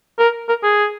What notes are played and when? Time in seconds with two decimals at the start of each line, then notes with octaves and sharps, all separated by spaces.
0.19 A#4
0.49 A#4
0.63 G#4